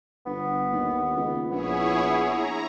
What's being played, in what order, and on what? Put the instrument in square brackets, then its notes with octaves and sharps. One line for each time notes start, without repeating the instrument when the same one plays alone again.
[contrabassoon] G1 [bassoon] B3
[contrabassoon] D#2
C#2
[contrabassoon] A#1 [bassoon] B3 [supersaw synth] E4 G#4 C#5
[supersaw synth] A#5